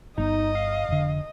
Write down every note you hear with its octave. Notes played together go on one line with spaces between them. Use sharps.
G1 B3 D#4 D#5
F5
F1 D3